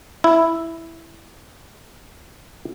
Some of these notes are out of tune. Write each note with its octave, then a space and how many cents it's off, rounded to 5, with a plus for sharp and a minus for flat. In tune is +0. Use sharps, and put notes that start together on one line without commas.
E4 +0